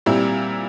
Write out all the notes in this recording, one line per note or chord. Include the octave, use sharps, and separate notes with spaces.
A#2 G3 C4 E4